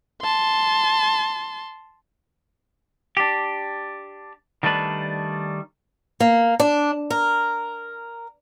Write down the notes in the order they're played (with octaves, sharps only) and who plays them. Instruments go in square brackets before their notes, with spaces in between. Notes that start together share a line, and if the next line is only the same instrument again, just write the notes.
[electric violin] A5 C6
[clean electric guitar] D4 G4
D#3 G3 A3 D4 B4
[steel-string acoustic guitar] A#3
D4
A#4